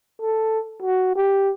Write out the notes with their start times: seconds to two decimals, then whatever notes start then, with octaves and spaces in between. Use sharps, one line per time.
0.22 A4
0.83 F#4
1.16 G4